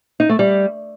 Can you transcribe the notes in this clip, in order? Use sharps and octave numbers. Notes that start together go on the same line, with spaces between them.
D#4
A3
G3